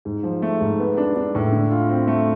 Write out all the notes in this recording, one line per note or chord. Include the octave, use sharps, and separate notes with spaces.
G#2
F3
A3
G#2
B3
D4
D4
A2
D3
F4
C4
A3